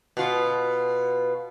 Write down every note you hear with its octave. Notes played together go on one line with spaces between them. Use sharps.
B2 F4